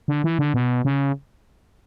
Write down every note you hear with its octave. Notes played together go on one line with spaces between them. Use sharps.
D3
E3
D3
B2
C#3